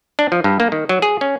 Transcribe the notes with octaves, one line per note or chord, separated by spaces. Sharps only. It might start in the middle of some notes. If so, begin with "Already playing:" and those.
D4
F3
G2
A#3
D#3
F#3
G#4
C#4